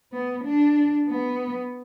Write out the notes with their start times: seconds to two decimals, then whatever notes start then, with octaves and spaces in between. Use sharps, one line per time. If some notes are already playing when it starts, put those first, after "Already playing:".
0.12 B3
0.45 D4
1.09 B3